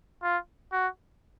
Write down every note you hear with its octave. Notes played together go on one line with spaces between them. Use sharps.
F4
F#4